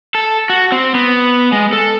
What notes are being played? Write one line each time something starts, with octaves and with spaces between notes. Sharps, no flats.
A4
F#4
C4
B3
G#3
A4